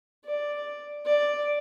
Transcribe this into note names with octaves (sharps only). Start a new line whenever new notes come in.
D5
D5